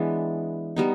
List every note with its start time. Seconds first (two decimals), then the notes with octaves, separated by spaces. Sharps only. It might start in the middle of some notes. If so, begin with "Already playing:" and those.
Already playing: E3 G#3 B3 D4
0.76 G3 B3 D#4